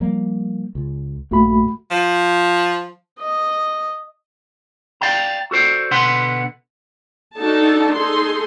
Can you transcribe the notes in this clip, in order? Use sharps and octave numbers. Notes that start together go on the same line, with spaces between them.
F3 G3 A#3
C#2
A#1 G2 A3 A#3 F#4 B5
F3
D#5
D5 F5 G5 A#5
F#4 A4 C5 D5
B2 D3 B3 B4 F#5 C6
D4 D#4 F#4 A4 A5
D#4 G#4 A4 C6